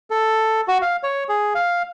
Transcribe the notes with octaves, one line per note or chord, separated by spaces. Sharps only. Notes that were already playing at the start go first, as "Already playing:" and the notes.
A4
F#4
F5
C#5
G#4
F5